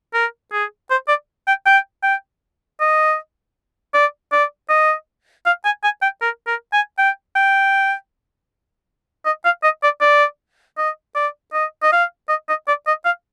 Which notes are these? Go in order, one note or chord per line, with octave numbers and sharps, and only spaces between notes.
A#4
G#4
C5
D5
G5
G5
G5
D#5
D5
D5
D#5
F5
G#5
G#5
G5
A#4
A#4
G#5
G5
G5
D#5
F5
D#5
D5
D5
D#5
D5
D#5
D#5
F5
D#5
D#5
D5
D#5
F5